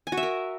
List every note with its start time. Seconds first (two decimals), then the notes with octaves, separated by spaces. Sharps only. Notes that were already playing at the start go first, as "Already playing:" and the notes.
0.07 G#5
0.12 F#4
0.17 E5
0.23 A#4